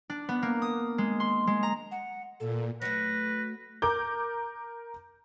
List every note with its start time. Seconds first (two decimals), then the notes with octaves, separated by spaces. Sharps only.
0.10 D4
0.29 B3
0.42 A#3
0.62 D#6
0.98 G#3
1.20 C6
1.47 G#3
1.63 A#5
1.91 F#5
2.40 A#2 A4
2.82 F#3 A3 B4 A#6
3.82 A#4 D6 G6